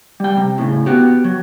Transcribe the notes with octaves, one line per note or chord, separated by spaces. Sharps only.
G3 G5
C3
A2 C#3
B3 F#4 G4
F#3